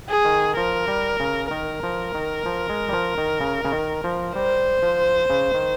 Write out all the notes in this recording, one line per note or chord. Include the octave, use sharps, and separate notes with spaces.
G#4
D#3
F3 A#4
G3
C#3
D#3 A#4
F3
D#3
F3
G#3
G3
F3
D#3
C#3
C#3
D#3
F3
G3 C5
F3
C#3
D#3